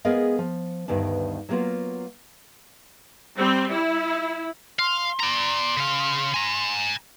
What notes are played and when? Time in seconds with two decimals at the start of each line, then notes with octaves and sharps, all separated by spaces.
0.05 G#3 B3 G#4 A#4 D#5 F5
0.39 F3
0.88 D2 G2 D#3 B3 D4
1.49 F#3 G3 A#3 B3 F4 F#4
3.36 G3 C4
3.70 E4
4.79 F5 C6
5.20 D5 A#5
5.77 C#3 F5
6.34 G#5 A#5